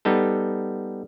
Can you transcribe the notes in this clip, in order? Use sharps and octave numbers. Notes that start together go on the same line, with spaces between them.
G3 B3 D#4 A4